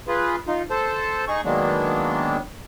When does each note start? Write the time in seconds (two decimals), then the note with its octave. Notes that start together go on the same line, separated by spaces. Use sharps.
0.08 F4 G#4 B4
0.47 D#4 F4
0.70 A4 C5 A5
1.28 D#4 G#4 C#6
1.45 D#3 F#3 G#3 A#3 B3 D4